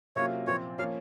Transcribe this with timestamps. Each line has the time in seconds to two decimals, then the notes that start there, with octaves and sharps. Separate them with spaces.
0.16 C3 F#3 A#3 C#4 F4 C#5
0.47 A#2 F3 C4 C#5
0.79 F3 A#3 C#4 F5